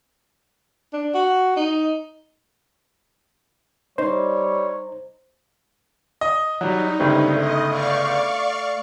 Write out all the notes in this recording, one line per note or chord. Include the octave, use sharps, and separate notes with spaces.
D4
F#4
D#4
G3 D#4 C5 C#5
D#5
F#3 G3 D#4
G1 C#2 G3 A3 C4
A3 D#5
D5 F5 C#6